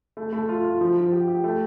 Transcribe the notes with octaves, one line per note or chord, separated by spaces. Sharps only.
A3
A3
F4
F4
F3
F3
G4
G4
A3